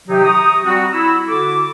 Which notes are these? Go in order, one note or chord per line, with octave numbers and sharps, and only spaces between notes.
C3 D#3 F#3 D#4 G4
A#5 C#6 D#6
G3 C4 F#4
E4 E6
D3 F#4 A4 D6